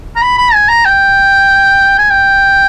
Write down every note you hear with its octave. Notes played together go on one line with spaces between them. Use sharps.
A#5
B5
B5
G#5
A#5
G5
G#5
G5